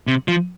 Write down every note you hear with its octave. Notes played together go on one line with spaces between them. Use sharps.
C3
F3